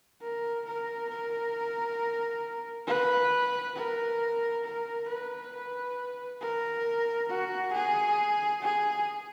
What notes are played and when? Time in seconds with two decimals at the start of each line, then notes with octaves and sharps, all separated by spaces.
0.21 A#4
0.66 A#4
1.10 A#4
2.87 B4
3.76 A#4
4.64 A#4
5.08 B4
6.41 A#4
7.29 F#4
7.74 G#4
8.62 G#4